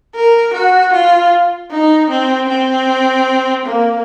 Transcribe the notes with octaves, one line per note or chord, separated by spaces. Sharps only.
A#4
F#4
F4
D#4
C4
C4
A#3